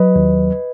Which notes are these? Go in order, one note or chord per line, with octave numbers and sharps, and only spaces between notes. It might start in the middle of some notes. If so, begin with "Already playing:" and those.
Already playing: F#3 B4 D#5
D#2